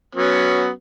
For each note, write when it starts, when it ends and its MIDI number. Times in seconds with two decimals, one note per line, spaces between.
0.15 0.69 54
0.15 0.69 59
0.15 0.69 61